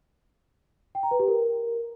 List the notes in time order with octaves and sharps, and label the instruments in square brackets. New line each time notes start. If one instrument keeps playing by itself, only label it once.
[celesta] G5
A#5
B4
G4
A#4